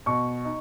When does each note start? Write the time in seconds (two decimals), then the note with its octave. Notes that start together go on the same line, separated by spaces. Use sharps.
0.06 B2 C#6
0.45 D#4